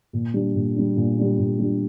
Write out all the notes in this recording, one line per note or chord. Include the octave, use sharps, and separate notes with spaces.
A#2
G3 D4
A#2
G3 D4
A#2
G3 D4
A#2
G3 D4